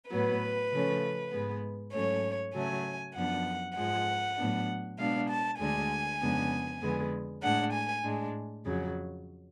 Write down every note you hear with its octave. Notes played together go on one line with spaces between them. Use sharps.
A2 F#3 B3 B4
C#3 F3 A3 C#4
G#2 G#3 B3
G#2 F#3 A3 C#4 C#5
C#3 F#3 A3 G#5
F#2 F3 B3 D4 F#5
G#2 F3 G#3 F#5
A2 F#3 B3 D4
B2 G#3 B3 D4 F5
A5
D2 D3 G#3 D4 G#5
F2 C#3 G#3 B3 D4
F2 D3 G#3 B3
A2 G#3 D4 F#5
G#5
A2 G#3 D4
F2 C#3 F#3